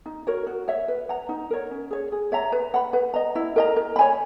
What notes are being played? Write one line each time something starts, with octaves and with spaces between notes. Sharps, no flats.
D#4
F#4 A#4 C#5
F#4
C#5 E5
B4
F#5 A#5
D#4
A#4 C#5
C#4
G#4 C#5
G#4
C#5 E5 A#5
B4
F#5 B5
B4
D#5 A#5
E4
A#4 D#5 A#5
A#4
C#5 G#5 B5